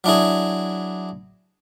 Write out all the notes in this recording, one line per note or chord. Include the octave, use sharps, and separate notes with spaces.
F#3 D4 E4 G#4